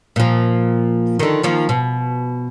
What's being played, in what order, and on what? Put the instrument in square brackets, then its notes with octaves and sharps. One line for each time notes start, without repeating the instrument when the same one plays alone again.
[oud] A#2 F3
D3 D#3
D#3 F3 A#3
B2